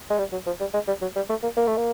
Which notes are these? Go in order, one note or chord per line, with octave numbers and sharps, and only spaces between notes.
G#3
G3
F#3
F3
G3
G#3
G3
F#3
G3
A3
A#3
A#3
A3
A#3